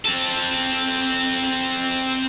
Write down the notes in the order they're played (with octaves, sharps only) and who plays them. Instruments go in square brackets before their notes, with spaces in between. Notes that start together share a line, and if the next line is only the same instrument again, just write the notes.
[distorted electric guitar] C4 A4